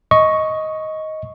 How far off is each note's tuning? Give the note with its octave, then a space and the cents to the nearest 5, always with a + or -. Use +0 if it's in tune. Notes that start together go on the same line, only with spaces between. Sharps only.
D#5 +10 C#6 +0